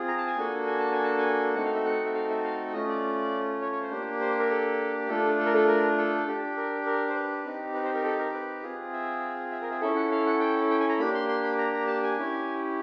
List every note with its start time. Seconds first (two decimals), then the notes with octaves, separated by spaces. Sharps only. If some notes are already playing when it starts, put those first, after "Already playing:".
Already playing: C4 F4 G#4
0.08 A#5
0.18 A5
0.27 G#5
0.37 A#3 D4 F#4 A4
0.66 G#5
0.79 A5
0.92 G#5
1.04 A5
1.18 G#5
1.55 A3 C4 D#4 F#4 A4 F#5
1.65 F5
1.75 E5
1.85 F#5
2.04 E5
2.14 F5
2.29 E5
2.44 F5
2.73 A3 C#4 F4 D#5
2.88 D5
3.61 C#5
3.72 C#5
3.81 C5
3.91 A#3 D4 G4
4.20 C5
4.39 A#4
4.50 A4
5.09 A3 D4 F4 A4
5.39 A4
5.46 A#4
5.54 A4
5.68 A#4
5.98 A4
6.27 D4 G4
6.57 A#4
6.86 A#4
7.09 C5
7.15 B4
7.45 C4 D#4 G4
7.74 B4
7.84 C5
7.94 A#4
8.04 A4
8.19 A#4
8.34 B4
8.63 C4 F4 G#4
8.93 E5
9.52 E5
9.62 A#4
9.71 E5
9.81 C#4 E4 A4 E5
9.96 F#5
10.11 F5
10.26 F#5
10.40 G5
10.70 G5
10.80 G#5
10.89 A#5
10.99 A#3 D4 G4 B5
11.14 C6
11.29 C6
11.44 B5
11.58 A#5
11.73 A#5
11.87 A5
12.03 G#5
12.18 C#4 E4 G4